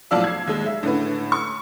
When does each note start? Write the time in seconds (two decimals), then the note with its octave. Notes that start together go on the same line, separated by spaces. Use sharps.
0.11 B1 A2 F3 D5 F5 E6
0.24 G#6 C7
0.47 D#2 G#3
0.66 E5
0.83 A2 D3 C#4 B4
1.32 C#6